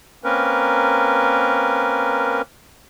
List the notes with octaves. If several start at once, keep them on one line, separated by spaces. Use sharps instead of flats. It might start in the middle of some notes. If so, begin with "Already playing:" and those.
A#3 C4 C#4 A#4 B4